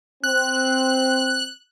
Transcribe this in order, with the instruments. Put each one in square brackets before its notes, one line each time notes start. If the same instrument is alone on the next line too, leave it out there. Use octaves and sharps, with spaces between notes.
[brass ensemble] C4 [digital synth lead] F#6